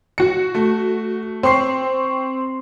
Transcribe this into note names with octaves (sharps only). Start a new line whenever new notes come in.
F#4 C#7
A3
C4 C6 C#6 C7